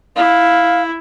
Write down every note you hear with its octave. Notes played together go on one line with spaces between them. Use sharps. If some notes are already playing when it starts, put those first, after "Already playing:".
E4 F5